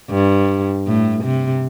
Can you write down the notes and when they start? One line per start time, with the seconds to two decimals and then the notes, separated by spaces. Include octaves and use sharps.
0.10 G2
0.87 A2
1.24 C3